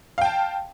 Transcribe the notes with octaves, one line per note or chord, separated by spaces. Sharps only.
F5 G5 A5